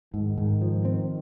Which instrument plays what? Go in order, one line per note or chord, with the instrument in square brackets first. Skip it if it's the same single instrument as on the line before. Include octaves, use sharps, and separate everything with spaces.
[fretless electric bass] G#2 [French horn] D#3
[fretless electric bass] G#2
F3
C4